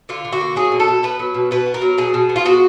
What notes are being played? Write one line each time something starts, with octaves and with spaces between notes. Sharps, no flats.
D3 F4
D3
F#4
A#3
F#3 G#4
B2
A4
B2
B3 B4
F#3
B2
B2 B4
B3
A#4
F#3
B2 G#4
B2
B3
F4
G#3 F#4